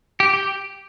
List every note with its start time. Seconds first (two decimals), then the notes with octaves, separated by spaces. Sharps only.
0.20 G4
0.34 G4